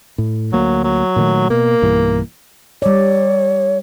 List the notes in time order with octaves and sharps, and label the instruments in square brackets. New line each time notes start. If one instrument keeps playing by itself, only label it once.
[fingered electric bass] A2
[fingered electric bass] D2 A#3 [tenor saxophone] F#3
[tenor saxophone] F#3
[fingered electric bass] A#2 D#3 A3
[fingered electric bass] B2 [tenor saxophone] A#3
[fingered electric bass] B1 G2 E3
[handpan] G3 D5 [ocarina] C#5